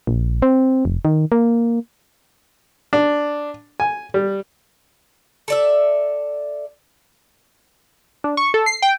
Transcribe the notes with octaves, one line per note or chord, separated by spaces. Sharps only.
A#1
C4
F1
D#3
A#3
D4
G#5
G3
A4 D5 E5
D4
C#6
A4
C7
G5